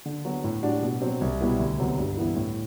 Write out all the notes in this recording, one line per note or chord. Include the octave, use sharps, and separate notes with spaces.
D3
F#3 B3 F#4
A2
G3 D4 F#4
B2
F#3 C4
C2
B2 G3 B3 E4
D2
C3 F#3 B3
G2
E3 B3 E4
A2